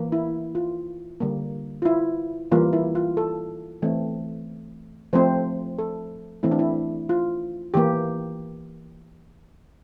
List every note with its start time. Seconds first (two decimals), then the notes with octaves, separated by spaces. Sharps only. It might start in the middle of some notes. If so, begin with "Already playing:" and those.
Already playing: E3 A#3
0.12 E4
0.55 F4
1.20 D3 G3 A#3
1.82 F4
1.85 E4
2.51 E3 G3 A#3 F4
2.73 E4
2.95 F4
3.17 A4
3.82 E3 A3 C4
5.13 F3 A3 C4 C5
5.78 A4
6.43 E3 A3 C4 E4
6.51 D4
6.59 E4
7.09 F4
7.74 E3 A#3 G4